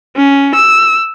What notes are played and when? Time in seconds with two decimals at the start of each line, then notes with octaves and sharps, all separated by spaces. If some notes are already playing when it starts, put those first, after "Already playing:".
0.16 C#4
0.55 E6